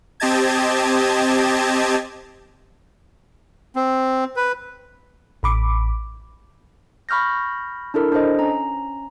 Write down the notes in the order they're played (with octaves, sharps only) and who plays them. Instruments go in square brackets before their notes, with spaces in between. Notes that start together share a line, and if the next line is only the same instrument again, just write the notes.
[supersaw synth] C4 G4 D#5 A5 G#6
[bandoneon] C4
B4
[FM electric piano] A1 B5 D6
[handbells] B5 C#6 F6 G6 A#6
D4 E4 A4 A#4
D4 A4 C5 D#5
C#4 A#5